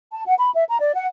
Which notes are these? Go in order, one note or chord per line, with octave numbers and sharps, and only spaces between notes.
A5
F#5
B5
E5
A#5
D5
F#5